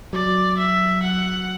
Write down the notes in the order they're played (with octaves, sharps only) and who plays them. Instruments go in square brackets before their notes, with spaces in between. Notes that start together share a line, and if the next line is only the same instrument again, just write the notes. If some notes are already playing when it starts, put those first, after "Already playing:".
[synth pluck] F#3 [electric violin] D5
[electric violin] E5
F#5